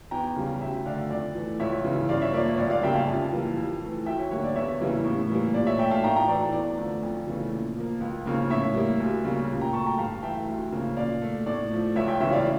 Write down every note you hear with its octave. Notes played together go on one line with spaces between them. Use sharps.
E2 G5 A#5
C#3 G3
D2 E5 G5
D3 A3 D5 F5
F2 D5
E3 A3
C#2 C#5 E5
C#3 E3
G2 D5 F5
C#5 E5
F3 A#3 D5
C#5
C#2 D5
D5 F5
C#3 G3 A#3 E5 G5
F5 A5
F2
E3 G3 A#3
F2
E3 A3
D2 E5 G5
C#5
D3 G3 A#3 C#5
D5
E2 C#5 E5
C#3 E3 G3 A#3
A2
E3 G3 A#3
A#2 D5
C#5 E5
A3 E5 G5
F5 A5
A2 G5 A#5
G5 A#5
E3 A3 D5
E2 D5
D3 F3 A3
F2
C#3 E3 A3
A#2
F3 A#3
C#2
C#3 F3 A#3
A2 C#5 E5
G3 A#3
D2
C#3 G3 A#3
A#2
G5 A#5
A3 A5 C#6
G5 A#5
G2 F5 A5
E3 A3 E5 G5
D2
C#3 F3 A#3
A#2 D5 F5
A3
A2 D5
F3 A3
C#2 C#5 E5
E5 G5
C#3 E3 C#5 E5
D5 F5